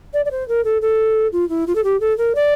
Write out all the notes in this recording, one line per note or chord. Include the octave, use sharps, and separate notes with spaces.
D5
D5
C5
A#4
A4
A4
F4
E4
F4
A4
G4
A4
A#4
D5